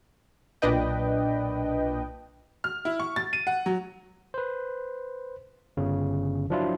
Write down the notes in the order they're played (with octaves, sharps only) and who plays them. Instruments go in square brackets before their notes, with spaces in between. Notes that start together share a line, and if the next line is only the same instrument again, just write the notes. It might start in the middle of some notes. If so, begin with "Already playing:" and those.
[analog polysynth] B1 A#2 D4 B4 D#5 G5
[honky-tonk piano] F6
E4
C#6
A6
D#7
F#5
F#3
[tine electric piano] B4 C5
G1 C#3
F3 F#3 D4 E4 F4